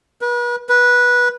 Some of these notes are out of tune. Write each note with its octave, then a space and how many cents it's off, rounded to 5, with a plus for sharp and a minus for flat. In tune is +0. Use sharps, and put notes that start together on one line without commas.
B4 -40
B4 -15